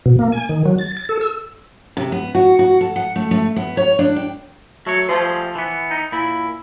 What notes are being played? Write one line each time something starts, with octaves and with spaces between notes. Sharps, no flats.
B2
A#3
G#5
D#3
F#3
A6
A6
A4
E6
C3
B3
F#4
F#4
A4
F#5
A3
A3
B3
C#5
D4
G5
F#3 A3 C#5
F3 G3 A3 G#4
E3 B3
D#4
A#2 E4